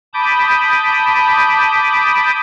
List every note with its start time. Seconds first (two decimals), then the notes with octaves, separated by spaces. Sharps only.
0.14 A5 B5 D6 D#6 G6